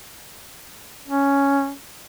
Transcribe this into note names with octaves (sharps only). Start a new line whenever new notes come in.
C#4